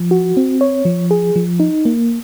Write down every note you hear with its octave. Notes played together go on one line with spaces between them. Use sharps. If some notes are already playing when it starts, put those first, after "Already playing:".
Already playing: F3
F#4
C4
C#5
F3
G#4
F3
D#4
A#3